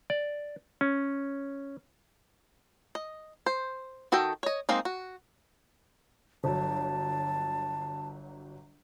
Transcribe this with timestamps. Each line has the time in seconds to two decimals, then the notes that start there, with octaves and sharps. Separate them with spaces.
0.10 D5
0.81 C#4
2.95 D#5
3.46 C5
4.12 D#3 F#4 A4 D#5 G5
4.43 C#5 D#5
4.69 G#3 A#3 C4 D#4
4.85 F#4
6.44 G1 F#3 A5